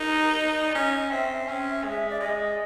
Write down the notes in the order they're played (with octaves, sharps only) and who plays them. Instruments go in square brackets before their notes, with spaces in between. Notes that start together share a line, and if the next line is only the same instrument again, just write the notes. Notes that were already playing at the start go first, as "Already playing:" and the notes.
Already playing: [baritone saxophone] D#4 [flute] A#4
[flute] D5
[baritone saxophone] C#4 [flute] D#5
[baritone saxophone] C4 [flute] E5
[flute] E5
[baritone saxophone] C#4
[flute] E5
[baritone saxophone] G#3
[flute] E5
D5
[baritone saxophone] G#3 [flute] D#5